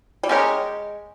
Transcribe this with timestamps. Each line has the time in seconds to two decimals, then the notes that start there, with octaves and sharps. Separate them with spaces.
0.23 G3
0.29 G#3 C#4 G4 A#4 C#5